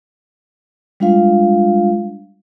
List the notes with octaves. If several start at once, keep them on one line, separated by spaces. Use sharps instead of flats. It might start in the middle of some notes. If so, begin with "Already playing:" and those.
G3 G#3 D4 F4 F5